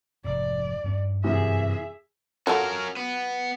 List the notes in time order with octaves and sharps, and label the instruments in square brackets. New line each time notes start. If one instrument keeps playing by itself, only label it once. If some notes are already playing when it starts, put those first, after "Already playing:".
[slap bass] F1 G#2 [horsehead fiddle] D5
[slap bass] G2 C4 C#4
[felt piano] F#2 C3 E3 [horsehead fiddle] G#4 E5
[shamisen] F#3 F4 A4 [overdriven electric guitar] C#4 A#4
[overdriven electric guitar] B3